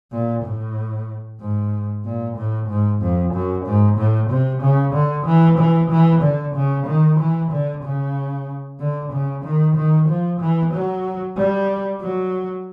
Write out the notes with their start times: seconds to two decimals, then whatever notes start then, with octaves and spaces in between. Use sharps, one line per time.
0.12 A#2
0.44 A2
1.40 G#2
2.05 A#2
2.36 A2
2.69 G#2
3.01 F2
3.33 F#2
3.65 G#2
3.98 A2
4.30 C3
4.62 C#3
4.94 D3
5.26 E3
5.58 E3
5.90 E3
6.22 D3
6.55 C#3
6.86 D#3
7.19 E3
7.51 D3
7.83 C#3
8.80 D3
9.12 C#3
9.44 D#3
9.76 D#3
10.09 F3
10.40 E3
10.73 F#3
11.36 G3
12.01 F#3